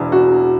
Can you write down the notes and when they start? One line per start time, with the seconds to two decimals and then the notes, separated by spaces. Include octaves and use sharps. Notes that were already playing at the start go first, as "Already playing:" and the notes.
Already playing: E1 E2
0.12 F#4